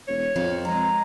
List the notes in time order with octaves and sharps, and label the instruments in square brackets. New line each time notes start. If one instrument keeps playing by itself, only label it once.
[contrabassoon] E1 [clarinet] C#5
[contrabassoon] F2 [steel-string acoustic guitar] F3
[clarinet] G#3 [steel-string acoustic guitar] C4 [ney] A#5